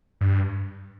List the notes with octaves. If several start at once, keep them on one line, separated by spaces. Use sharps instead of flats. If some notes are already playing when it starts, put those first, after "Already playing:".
G2